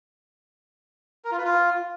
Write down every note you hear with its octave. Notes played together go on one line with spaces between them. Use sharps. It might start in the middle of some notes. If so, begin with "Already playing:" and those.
A#4
F4
B4
F4